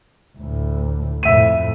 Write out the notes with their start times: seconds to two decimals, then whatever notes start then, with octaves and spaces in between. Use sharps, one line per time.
0.38 D2 A2
1.23 F2 A2 E5 D#7